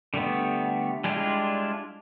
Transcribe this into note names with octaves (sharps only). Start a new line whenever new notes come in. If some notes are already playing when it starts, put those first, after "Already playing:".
D3 G3 A3 B3
G3 G#3 D4 E4 F4